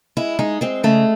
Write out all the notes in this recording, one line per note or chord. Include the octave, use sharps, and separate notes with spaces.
G#3 E4
G#3 D#4
G#3 C4
C#3 A3